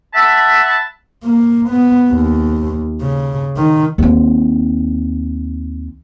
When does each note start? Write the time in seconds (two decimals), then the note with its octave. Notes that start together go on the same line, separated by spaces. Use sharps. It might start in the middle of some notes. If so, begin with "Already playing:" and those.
0.14 E5 F#5 A5 B5
1.24 A#3
1.70 B3
2.10 D#2
3.01 C#3
3.57 D#3
3.98 D#2 C4